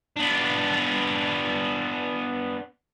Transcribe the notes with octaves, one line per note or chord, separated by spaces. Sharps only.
B3 D4